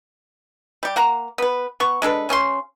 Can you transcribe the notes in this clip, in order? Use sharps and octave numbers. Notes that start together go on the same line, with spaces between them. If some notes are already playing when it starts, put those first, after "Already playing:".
G3 G4
A#3 F#5 A#5
B3 B4
B3 C#6
G#3 D4 A4 B4
C#3 C#4 D4 C6